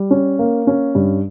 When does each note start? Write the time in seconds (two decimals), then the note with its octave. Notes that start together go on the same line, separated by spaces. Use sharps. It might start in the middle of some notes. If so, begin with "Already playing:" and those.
Already playing: G3
0.11 C#4
0.39 A#3
0.67 C#4
0.95 G2